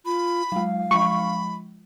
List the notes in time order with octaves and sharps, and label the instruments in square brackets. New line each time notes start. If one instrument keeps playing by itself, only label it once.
[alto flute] F4 [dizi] B5
[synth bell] F#3 G#3 [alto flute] F5
[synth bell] F3 G#3 [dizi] B5 [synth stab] C#6